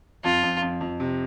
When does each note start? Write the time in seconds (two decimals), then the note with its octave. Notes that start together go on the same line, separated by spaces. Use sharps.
0.24 F2 F4
0.43 F2
0.62 F2
0.81 F2
1.00 C3